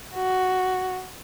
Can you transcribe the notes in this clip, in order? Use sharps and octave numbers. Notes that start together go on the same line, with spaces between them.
F#4